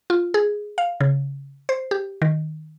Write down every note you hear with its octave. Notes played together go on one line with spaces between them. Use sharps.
F4
G#4
F5
C#3
C5
G4
D#3